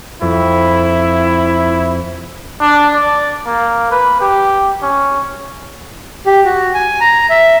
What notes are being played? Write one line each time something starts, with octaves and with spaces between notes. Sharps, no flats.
F2 E4
D4
D5
A#3
B4
G4
C#4
G4
F#4
G#5
A#5
E5